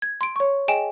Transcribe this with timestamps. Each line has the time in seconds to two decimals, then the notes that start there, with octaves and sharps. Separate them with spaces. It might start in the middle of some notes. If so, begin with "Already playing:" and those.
0.02 G#6
0.21 C6 D7
0.36 C#5 C#6
0.68 G#4 D#5 G5 G#5 D7 E7